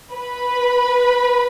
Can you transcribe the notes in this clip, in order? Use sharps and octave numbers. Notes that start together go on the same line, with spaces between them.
B4 B5